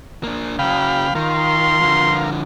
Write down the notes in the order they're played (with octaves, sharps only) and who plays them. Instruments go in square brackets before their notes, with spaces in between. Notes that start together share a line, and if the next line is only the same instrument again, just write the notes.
[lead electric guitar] A#3 D4
[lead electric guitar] C#3 F#3 [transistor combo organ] F5 G5 B5
[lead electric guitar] D#3 [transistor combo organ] F4 A#4 [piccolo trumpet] C6
[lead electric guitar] D3 F3